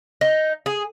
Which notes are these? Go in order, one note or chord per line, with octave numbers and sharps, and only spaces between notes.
D#4
G#4